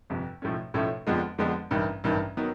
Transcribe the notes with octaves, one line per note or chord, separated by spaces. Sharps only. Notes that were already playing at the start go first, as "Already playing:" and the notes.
G1 F2 C3
B1 A2 F3 A3 C#4
B1 A2 F3 A3 C#4
F2 D3 F3 G#3 B3
F2 D3 F3 G#3 B3
A1 G2 D#3
A1 G2 D#3
D#3 F#3 B3